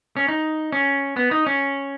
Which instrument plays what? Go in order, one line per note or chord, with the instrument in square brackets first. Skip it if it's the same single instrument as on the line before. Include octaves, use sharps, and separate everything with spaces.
[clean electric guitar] C#4
D#4
C#4
B3
D#4
C#4